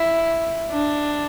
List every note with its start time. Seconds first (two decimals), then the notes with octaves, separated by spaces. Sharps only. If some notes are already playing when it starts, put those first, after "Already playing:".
Already playing: E4
0.71 D4